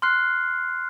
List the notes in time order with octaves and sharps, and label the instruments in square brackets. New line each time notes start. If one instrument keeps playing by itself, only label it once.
[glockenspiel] C6 F6 F#6 C7